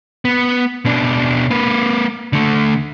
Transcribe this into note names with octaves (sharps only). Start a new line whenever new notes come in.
B3
B2 D4
A#3 B4
D3 A3